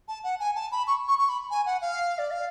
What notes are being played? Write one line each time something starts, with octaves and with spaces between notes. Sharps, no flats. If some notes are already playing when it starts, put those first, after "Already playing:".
A5
F#5
G#5
A5
B5
C#6
C#6
C#6
B5
G#5
F#5
F5
D5
F5